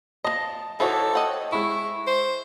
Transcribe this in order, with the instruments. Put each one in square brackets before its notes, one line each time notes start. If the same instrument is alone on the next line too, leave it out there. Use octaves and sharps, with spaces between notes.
[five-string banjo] F3 C4 D#5 [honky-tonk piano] A5
[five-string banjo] E3 D#4 F#4 [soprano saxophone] A4 [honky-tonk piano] C5 C#5 D6
[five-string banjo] D#5 F#5 G5
[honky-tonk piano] G#3 C#6 [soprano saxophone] E4
[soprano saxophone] C5